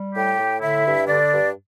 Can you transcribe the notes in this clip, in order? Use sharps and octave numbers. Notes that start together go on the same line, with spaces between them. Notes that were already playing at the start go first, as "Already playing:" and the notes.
Already playing: G3
A2 G4 G5
A2
D3 E4 E5
G2
D3 D4 D5
G2